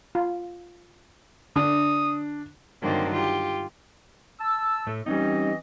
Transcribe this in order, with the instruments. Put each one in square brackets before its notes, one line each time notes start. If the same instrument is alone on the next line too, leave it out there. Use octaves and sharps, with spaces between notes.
[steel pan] F4
[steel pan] D3 [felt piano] D4 [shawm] D#6
[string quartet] G2 D3 D#3 F#3 A#3 C4
F4 G4
[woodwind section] A5 E6
[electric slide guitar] A2 A3
[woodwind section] E3 C4 D#5 [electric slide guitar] G3 C#4 D#4